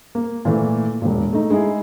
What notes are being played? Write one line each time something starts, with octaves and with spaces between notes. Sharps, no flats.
A#3
A#2 E3 A3
E1 A#2
A3 D#4
G#3 D#4 E4 G#4